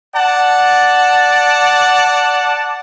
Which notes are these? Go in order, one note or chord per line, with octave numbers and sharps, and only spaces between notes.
D5 F#5 A5